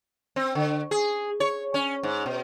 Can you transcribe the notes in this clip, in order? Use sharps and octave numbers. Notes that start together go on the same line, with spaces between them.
C4
D3
G#4
C#5
C#4
G#2
B2